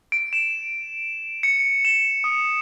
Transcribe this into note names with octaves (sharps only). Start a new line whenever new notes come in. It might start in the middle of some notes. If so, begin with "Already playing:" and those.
D7
E7
C#7
E7
D#6